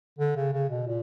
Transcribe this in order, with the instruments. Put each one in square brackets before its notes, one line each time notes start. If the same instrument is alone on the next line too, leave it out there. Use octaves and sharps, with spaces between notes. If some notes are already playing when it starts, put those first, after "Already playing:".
[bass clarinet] D3
C#3
C#3
B2
A#2